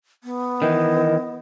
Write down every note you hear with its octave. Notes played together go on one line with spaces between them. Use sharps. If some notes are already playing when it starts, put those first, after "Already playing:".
B3
D#3 E3 D#5